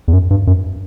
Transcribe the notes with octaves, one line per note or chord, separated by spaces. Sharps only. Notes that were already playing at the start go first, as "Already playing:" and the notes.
E2
F#2
G2
F#2